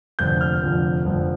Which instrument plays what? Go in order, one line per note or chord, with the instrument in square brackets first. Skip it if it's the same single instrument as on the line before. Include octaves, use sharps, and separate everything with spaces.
[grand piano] F1 F2 D3 F3 G6
F6
F1 F2 D3 F3
F1 F2 D3 F3